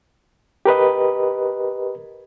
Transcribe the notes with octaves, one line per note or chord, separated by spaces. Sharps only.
G4 A#4 B4 D#5